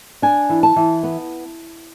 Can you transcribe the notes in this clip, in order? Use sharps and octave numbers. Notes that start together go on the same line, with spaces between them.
D4 G#5
E3
A5
E3
B3